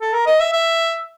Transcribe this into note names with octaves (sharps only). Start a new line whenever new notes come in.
A4
A#4
D#5
E5
E5